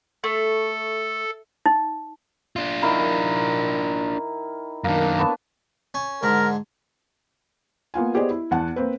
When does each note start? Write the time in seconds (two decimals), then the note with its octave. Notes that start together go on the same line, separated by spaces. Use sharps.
0.24 A3 A4
1.66 D#4
2.56 D4 F4
2.82 D#3 E4 A#4
4.84 F#2 D#3 A#3 D4
5.18 B3 C#5 A5
5.94 C#4
6.23 G#2 D3 A#4
7.94 A#3 B3 F4 G#5
8.14 B3 G4 G#4 C5 D5 D#5
8.30 E4
8.51 E2 F#5 A5
8.76 A#3 C4 B4